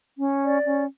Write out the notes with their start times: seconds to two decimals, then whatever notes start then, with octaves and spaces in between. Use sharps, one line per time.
0.18 C#4
0.43 D5
0.65 C#4